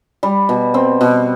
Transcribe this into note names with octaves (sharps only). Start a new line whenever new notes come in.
G3
B2
C4
B2